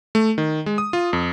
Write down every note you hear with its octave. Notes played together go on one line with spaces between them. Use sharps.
A3
D#3
G#3
D#6
F4
F2